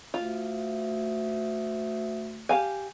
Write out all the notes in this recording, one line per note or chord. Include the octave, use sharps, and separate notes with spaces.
D2 F4
G4 F5 G#5